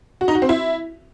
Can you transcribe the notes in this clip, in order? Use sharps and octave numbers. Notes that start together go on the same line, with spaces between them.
F#4
D#4
F#4
C4
E4